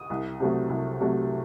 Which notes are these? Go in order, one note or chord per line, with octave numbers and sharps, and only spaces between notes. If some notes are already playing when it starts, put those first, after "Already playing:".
Already playing: D#6
C2
C3 F#3 A3
C2
C3 F#3 A3